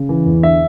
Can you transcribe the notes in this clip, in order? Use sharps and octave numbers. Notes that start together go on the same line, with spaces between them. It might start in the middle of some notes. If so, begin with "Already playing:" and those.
Already playing: C#3
E3
E2
D3 E5